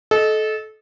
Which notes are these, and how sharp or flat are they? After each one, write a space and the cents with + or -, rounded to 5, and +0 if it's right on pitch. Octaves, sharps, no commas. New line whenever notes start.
A4 -25 D#5 +0